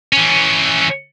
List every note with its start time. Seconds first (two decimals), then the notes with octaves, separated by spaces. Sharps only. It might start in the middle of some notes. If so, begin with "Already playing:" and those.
0.13 E3 C#4